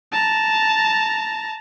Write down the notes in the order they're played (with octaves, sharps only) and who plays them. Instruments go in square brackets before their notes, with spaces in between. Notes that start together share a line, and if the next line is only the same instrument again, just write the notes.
[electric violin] A5 A#5